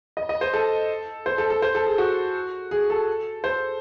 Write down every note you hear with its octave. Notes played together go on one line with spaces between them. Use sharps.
D#5
D#5
C5
A4
C5
A4
A4
C5
A4
G#4
F#4
G#4
A4
C5